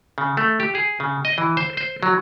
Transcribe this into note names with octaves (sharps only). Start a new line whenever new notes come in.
C#3
A3
G4
G#4
C#3
D#5
E3
C5
C5
F#3